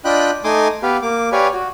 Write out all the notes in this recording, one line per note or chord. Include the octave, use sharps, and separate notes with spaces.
D4 F4 D#5 G5 B5 F#6
A3 D#4 G#5 C6 D6 D#6
B3 G4 B4 F5
A#3 D6
G4 B4 C#5 D5 F5 G#5
F#4